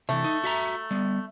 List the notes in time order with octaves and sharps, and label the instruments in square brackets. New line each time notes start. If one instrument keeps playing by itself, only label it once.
[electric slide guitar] C3 E3 [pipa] A3
[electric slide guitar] D#4
F#4 E5 A#5
G3 B3